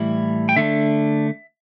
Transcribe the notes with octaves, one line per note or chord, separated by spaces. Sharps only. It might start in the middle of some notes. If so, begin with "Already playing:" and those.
Already playing: A2 E3 G3 E4
G5
D3 A3 D4 E5